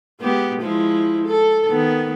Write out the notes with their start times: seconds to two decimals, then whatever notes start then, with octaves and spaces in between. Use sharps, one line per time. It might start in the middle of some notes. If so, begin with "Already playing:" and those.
0.20 G#3 B3 G4
0.60 F3 G#3 E4
1.27 A4
1.68 D#3 B3